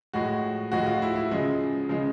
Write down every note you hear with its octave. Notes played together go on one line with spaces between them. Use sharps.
A2 F3 G#3 F#4
A2 F3 G#3 F#4
F4
E4
E4
C#3 F3 G#3
C#3 F3 G#3